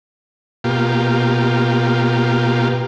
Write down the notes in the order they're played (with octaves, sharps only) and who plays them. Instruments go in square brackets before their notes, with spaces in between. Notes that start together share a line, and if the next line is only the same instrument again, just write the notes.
[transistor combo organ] B2 A#3 F4 G4